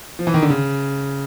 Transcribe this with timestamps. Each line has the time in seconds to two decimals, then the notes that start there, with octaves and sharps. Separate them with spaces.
0.19 F3
0.27 E3
0.34 D#3
0.43 D3
0.50 C#3